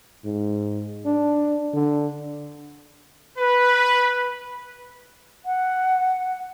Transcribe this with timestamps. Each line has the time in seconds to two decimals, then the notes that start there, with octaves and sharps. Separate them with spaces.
0.24 G#2
1.05 D4
1.73 D3
3.39 B4
5.46 F#5